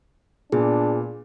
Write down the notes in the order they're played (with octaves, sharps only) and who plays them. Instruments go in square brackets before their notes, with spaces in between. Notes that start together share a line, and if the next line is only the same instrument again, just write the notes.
[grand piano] A#2 B3 [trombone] D4 [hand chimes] G#4